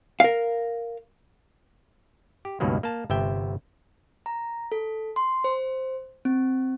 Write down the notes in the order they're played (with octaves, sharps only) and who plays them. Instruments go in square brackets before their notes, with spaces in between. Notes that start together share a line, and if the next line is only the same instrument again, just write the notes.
[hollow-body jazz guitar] A#4 F5
[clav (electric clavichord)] G4
C#2 G2 B2 D#3 F#3 A#3
A#3 A5
G1 C3 E5 G5
[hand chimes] A#5
A4
C6
C5
C4